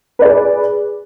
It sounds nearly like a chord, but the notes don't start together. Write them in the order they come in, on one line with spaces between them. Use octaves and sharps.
B4 D5 G#4